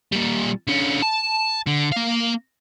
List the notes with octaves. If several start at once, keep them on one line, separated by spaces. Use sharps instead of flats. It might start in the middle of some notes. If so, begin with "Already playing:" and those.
A#2 G3
D3 C#4
A5
D3
A#3 F5